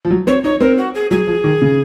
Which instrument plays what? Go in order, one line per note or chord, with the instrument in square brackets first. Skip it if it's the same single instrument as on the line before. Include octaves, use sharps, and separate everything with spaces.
[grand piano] F3
F#3
[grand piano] C4 [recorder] C#5
[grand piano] D#4 [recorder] C#5
[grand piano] C4 [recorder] A#4
[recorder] F#4
G#4
[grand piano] F#3 [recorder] G#4
[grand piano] F3
D#3
C#3